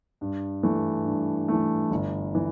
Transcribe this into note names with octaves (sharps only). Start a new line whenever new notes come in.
G2
E3 A3
G2
E3 A3
G1
E3